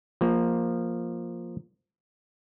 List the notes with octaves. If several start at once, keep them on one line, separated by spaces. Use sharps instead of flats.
F3 A#3